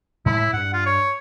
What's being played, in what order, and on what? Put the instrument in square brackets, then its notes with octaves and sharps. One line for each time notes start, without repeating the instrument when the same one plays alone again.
[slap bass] A2 G#3 [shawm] E4
[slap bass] G2 [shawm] F#5
[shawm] F4
C#5